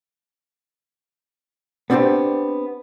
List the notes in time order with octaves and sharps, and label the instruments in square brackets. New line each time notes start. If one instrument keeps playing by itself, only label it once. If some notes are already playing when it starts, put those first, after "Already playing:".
[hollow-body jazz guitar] B3 C4 D4 F#4 G4 C5